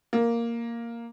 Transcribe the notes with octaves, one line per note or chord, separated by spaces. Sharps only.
A#3